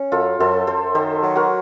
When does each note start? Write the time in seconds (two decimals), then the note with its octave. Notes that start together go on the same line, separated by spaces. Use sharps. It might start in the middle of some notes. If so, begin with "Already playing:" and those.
Already playing: C#4
0.12 F#2 F4 A4
0.39 F#2 A4 C5
0.67 F#2 A4 C5
0.95 D#3 A4 C5
1.22 F#3
1.36 F#4 A#4